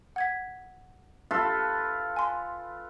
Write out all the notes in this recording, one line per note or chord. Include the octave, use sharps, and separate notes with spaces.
F#5 G#6 B6
F4 A4 B4
G#5 C6